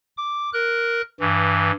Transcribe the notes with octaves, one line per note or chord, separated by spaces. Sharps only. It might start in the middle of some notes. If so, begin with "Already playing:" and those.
D6
A#4 F#6
G2 E3